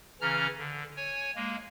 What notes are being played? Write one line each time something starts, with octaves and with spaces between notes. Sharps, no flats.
C#3 E3 C#4 A#5 F6
D3
C#5 G#5
G#3 A#3